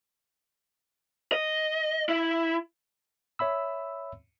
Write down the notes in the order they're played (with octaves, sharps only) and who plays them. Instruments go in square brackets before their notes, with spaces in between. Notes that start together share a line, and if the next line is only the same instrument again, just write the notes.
[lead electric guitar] D#5
E4
[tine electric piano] C#5 E5 B5 E6